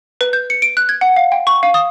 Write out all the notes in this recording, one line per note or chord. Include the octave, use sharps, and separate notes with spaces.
B4
G6
C#7
D7
F#6
G#6
F#5
F5
G5
C#6
F5
D#6